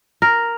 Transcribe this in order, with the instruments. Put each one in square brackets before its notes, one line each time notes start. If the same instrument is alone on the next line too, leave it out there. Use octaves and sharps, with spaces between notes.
[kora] A#4